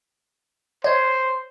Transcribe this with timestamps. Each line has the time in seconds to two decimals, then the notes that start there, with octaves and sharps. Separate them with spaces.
0.84 C5 C#5